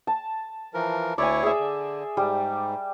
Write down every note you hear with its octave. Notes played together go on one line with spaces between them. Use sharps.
A5
E3 F3 A#4
D2 E4 C#5 D5 G#5
G#4 E5
D3
G#2 G3